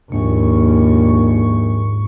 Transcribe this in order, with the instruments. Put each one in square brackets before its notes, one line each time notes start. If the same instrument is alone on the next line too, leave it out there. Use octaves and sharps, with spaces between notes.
[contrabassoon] A#1 [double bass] D#2 [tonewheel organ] G#2 C#6